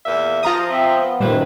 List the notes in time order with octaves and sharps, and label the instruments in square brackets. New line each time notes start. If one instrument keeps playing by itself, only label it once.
[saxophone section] E2 A#2 E5
[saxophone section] F3 [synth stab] F4 A#5 D#6
[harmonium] C4 E5
B3
[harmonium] F#2 D#3 [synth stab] A#2 G3 [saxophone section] E4 B4 C5